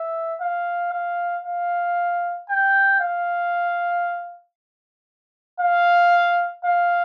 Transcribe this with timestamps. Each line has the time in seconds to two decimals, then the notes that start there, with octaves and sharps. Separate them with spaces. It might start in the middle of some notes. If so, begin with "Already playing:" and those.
Already playing: E5
0.41 F5
0.93 F5
1.44 F5
2.49 G5
3.01 F5
5.60 F5
6.64 F5